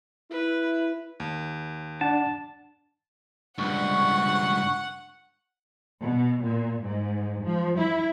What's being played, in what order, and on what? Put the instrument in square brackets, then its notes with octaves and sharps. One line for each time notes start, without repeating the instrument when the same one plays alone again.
[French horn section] E4 [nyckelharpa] B4
[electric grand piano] D#2
[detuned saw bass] D4 [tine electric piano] F#5 [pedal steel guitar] A5
[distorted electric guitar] C#2 G2 [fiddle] F#5 [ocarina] C#6
[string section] B2
A#2
G#2
F3
E4